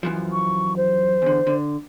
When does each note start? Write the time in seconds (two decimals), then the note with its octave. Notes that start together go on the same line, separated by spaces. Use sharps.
0.03 F#2 E3 F3
0.32 C#6
0.77 C5
1.22 E2 D3
1.47 D3